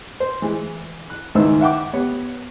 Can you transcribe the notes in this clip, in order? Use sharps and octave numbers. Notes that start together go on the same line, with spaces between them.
C5
E3 G#3
F#6
C#2 G#2 D#3 E4 C5 E6
E5 F#5 G5 D6
B3 G4 C#5